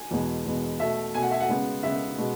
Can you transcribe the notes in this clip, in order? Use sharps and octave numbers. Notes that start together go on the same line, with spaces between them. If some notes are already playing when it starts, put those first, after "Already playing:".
Already playing: G#5
E2 B2 G#3 B3
E2 B2 G#3 B3
B2 A3 E5
B2 A3 G#5
F#5
E5
F#5
C#3 G#3 B3
C#3 G#3 B3 E5
B2 G#3 B3